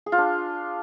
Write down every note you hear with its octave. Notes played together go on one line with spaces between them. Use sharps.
G#4
F4
D4